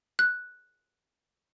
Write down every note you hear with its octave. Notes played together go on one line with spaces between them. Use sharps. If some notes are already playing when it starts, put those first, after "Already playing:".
F#6